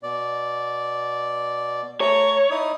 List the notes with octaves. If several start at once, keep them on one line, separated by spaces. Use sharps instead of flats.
B2 D5
A3 C#5 A#5
D#4 E4 D#6